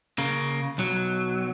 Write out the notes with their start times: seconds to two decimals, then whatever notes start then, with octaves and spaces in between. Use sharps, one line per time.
0.18 C#3 A#3
0.78 B1 F#3